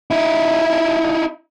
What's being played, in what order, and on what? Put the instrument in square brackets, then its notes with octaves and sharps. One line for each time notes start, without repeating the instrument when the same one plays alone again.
[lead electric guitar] D#4 E4